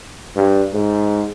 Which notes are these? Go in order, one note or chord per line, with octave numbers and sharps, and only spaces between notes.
G2
G#2